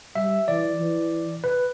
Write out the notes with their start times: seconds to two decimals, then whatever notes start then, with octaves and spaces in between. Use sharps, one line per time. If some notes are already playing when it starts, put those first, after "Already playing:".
0.15 G3 E5
0.47 E3 D5
0.80 E3
1.44 B4